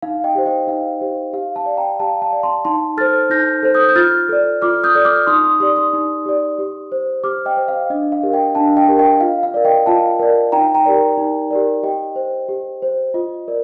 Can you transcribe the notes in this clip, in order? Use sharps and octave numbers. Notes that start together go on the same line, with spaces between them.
D#4 F5
D#5 G5
G4 C5
D#5 G5
D#4 F5
G4 C5
G4 F5
F5 A5
D5
G5 A#5
G4 F5 A5
F5 A5
D5
A5 C6
D#4 A5 C6
A4 C5 F6 A6
D#4 G6 A#6
A4 C5
D#6 G6
G6
F4 F6 A6
A4 D5
F4 D6 F6
D#6 G6
A4 D5
D6 F6
D#4 C6 D#6
C6 D#6
G4 D5 C6 D#6
C6 D#6
D#4
G4 D5
G4
C5
G4 D6 F6
D#5 G5
C5
F5
D4 D#5
F5
G4 A#4
D#5 G5
D4 F5 A5
D#5 G5
G4 A#4
D#5 G5
F4 F5
F5
A#4 D5
D#5 G5
F4 F5 A5
A#4 D5
D#4 G5 A#5
G5 A#5
G4 A#4 D5
D#4
G4 A#4 D5
G4 D#5 G5
C5
G4
C5
F4 D#5
A#4 D5